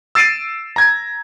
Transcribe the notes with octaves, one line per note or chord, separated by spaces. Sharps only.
E6 A6 C7 D7 D#7
A#5 G#6